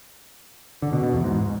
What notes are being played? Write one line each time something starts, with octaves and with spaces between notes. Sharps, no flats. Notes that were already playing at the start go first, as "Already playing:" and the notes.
D3
B2
B2
E2
G#2